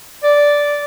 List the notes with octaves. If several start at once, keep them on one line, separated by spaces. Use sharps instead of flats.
D5